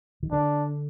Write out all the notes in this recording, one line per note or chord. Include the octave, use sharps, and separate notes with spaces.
D#3
D3 D4